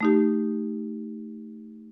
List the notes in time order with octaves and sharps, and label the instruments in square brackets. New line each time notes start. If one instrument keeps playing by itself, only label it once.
[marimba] A3 D#4 G4